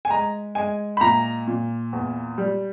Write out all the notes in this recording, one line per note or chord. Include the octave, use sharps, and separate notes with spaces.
G#5
G#3 A#5
G#3 G#5
B5
A#2 A#5
A#2
E2
G3